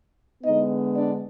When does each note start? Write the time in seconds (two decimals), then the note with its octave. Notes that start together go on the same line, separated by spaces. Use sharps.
0.43 D3 G#3 B3 D#4 D#5
0.95 D4 D5